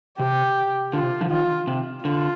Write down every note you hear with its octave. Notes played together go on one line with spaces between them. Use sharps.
C3 G4
D3 F4
C3
D3 F3
D#3 F4
C3
D3 F4